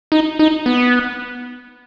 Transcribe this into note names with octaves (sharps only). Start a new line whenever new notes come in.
D#4
D#4
B3